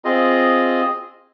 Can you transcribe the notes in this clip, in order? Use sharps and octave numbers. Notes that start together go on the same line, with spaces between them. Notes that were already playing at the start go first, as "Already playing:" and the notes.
C4 F4 G#4 D#5